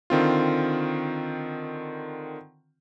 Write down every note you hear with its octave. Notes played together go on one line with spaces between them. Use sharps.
D3 D#3 C4 F4